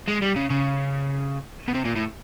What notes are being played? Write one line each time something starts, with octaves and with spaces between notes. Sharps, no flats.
G#3
G3
C#3
C#3
B2
C3
A#2
A2